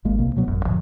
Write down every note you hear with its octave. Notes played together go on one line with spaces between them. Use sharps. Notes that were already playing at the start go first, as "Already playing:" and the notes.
G#1 G#3 A#3
C2 C3 A#3
B2 F#3 B3
E1 A1 F#2
F#2 A2 D3 F3